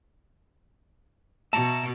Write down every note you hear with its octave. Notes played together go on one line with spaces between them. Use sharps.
B2 E5 A5 A#5 C#6